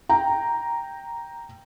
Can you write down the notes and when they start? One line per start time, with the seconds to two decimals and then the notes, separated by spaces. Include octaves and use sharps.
0.09 G5 A#5